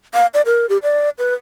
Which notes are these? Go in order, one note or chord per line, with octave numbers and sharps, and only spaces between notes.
F5
D5
A#4
G4
D5
B4